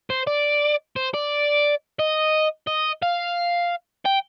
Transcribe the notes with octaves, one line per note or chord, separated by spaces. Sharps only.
C5
D5
C5
D5
D#5
D#5
F5
G5